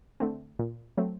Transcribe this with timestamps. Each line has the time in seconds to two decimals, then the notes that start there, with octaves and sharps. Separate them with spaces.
0.20 D3 A3 C4
0.59 A#2
0.97 F#3 A3 C4